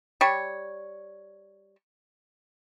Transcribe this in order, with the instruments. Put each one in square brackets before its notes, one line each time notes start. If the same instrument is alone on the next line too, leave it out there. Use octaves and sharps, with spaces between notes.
[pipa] G3 C#5